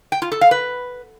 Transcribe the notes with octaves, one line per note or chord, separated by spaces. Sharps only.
G5
F4
A4
F5
B4